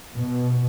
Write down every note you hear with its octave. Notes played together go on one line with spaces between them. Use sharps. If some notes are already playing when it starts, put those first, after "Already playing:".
B2